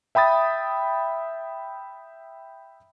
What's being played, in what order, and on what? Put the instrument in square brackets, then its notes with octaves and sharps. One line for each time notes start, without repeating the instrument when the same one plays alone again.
[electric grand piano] E5 G5 B5 D#6 A6